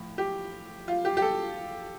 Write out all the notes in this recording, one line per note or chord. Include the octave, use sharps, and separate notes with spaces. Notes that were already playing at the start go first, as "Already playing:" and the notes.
Already playing: A2 F3
G4
F4
G4
G4
A4